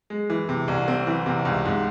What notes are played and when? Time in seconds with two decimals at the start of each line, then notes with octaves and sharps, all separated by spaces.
0.10 G#3
0.30 E3
0.49 C3
0.68 C2
0.88 C4
1.07 E3
1.26 C3
1.45 C#2
1.65 G#2